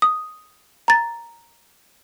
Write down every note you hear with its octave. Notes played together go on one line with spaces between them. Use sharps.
D#6
A#5 A6